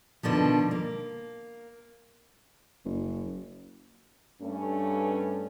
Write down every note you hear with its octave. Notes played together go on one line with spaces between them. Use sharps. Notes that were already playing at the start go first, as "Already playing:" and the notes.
B2 D3 D#3 F3
A#3
F#1
G2 A3 C#4